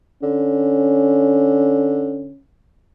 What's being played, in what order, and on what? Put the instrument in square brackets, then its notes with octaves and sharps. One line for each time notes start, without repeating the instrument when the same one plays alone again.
[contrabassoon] D3 [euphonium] C#4